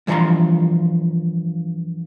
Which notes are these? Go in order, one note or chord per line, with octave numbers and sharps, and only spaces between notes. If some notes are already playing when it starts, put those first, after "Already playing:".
G2 E3 F3 C#5 A#5 C6